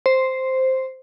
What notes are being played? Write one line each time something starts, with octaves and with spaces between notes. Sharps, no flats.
C5